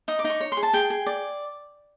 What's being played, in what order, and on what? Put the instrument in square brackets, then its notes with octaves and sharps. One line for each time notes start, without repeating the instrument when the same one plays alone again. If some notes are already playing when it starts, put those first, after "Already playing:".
[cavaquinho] D#4 D#6
D6
D#4
C#6
C#5
C6
G#4
A5
G#4 G5
G#4
D5